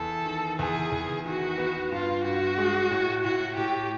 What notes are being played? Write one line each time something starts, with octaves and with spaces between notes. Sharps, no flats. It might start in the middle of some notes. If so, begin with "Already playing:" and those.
Already playing: E2 A4
D#3
E2 G#4
E2
D#3 F#4
B3
G2 F4
G2 F#4
G#3
A2
A2 F#4
A2 G4